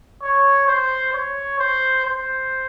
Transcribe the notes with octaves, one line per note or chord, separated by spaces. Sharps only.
C#5
C5
C#5
C5
C5